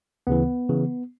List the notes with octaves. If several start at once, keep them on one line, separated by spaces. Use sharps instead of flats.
D2 C#3 E3 B3
C#3 E3